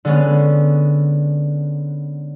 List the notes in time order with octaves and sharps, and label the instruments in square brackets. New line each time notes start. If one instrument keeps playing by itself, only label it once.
[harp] D3 G#3 B3 C#4